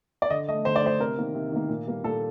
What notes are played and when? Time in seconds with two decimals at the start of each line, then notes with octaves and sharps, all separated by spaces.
0.22 D5
0.30 D3 D#5
0.49 A3 D#5
0.65 D3 C5
0.76 D5
0.83 A3 C5
1.00 C3 A#4
1.18 D#3 A#3
1.35 C3
1.52 D#3 A#3
1.69 A#2
1.87 G3 A#3
2.04 A#2 A4